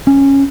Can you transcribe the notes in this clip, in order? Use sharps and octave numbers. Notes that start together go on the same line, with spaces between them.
C#4